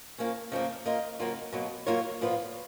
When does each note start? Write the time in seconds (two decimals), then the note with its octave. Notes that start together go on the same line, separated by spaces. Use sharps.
0.18 F3 A#3 C#4
0.52 C#3 F3 A#3
0.85 A#3 F4 A#4 D#5
1.19 C#3 F#3 A#3 F4 A#4
1.52 B2 F#3 A#3
1.87 F#3 A#3 F4 A#4 C#5
2.21 A#2 F3 B3 F4 B4